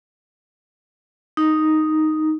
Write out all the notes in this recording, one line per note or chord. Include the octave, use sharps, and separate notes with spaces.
D#4